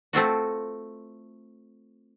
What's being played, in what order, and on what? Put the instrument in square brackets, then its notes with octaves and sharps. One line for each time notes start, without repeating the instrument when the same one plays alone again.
[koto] A3 C4 F4 F#4